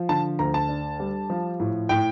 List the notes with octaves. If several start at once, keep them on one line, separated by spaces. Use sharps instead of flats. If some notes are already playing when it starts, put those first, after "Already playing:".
Already playing: F3
D3 A5
D2 A#5
A5
D4
G3
F3
A2
A2 G5